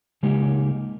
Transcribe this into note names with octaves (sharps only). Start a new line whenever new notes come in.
C#3 G#3 A#3 D#4 G4 A#4